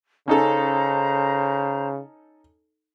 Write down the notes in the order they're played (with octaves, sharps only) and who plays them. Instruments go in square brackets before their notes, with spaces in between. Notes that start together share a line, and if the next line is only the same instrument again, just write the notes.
[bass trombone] C#3 [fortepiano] C#4 D#4 A4 [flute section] C5 A#5